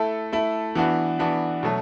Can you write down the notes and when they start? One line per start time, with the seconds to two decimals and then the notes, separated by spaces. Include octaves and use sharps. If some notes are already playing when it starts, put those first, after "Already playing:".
Already playing: A3 E4 A4
0.32 A3 E4 A4
0.75 E3 B3 D4 F#4
1.19 E3 B3 D4 F#4
1.63 B2 F#3 A3